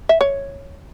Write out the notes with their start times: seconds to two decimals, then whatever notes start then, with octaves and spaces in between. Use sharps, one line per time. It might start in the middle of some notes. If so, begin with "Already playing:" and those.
0.09 E5
0.21 C#5